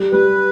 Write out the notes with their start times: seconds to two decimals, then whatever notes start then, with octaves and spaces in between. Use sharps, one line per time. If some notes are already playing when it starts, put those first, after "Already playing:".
Already playing: G3
0.12 G3 B4